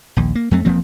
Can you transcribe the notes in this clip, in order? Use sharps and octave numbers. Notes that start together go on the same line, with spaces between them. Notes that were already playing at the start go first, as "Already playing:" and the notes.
A#1 D#2
A#3
F2 F#3 A3 C4
E1 F3 A#3 C4